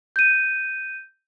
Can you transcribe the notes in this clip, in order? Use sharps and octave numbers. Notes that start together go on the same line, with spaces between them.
G6 D#7